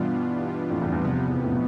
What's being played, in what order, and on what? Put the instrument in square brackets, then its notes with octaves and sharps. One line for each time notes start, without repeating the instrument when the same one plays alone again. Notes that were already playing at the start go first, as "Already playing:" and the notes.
Already playing: [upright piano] G2 B2 [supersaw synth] E3 G3 B3 D4 F4
[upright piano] F2 A2
E2 G2
E2
[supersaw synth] C3 F3 B3
[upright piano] E2
F2
A2
B2